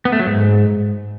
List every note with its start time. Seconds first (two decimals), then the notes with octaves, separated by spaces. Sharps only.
0.05 B3
0.12 A3
0.19 F#3
0.27 G#2